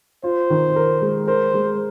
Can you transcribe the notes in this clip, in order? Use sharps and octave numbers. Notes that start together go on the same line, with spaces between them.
F4 C5
D#3
A#4
G#3
A#4 C5
G#3